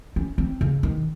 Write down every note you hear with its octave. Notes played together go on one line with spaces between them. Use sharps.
C#4
C4
C#3
D#3